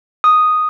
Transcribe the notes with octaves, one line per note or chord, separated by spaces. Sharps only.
D#6